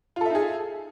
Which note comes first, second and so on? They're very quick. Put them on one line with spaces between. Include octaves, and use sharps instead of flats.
F4 A4 E5 D#4 G#4